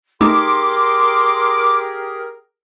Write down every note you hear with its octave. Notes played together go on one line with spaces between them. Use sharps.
A3 D#4 G4 G#4 A#4 C6 D6